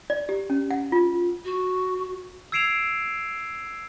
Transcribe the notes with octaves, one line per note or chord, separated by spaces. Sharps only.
D5
G4
C#4
F#5
F4
F#4
E6 G#6 C7 D7 E7 F7